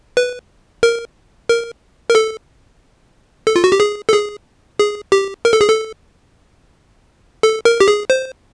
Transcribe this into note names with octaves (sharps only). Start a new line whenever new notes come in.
B4
A#4
A#4
A#4
A4
A4
F4
F#4
G4
G#4
A4
G#4
G#4
G4
A#4
A4
G#4
A4
A4
A#4
G4
G#4
C5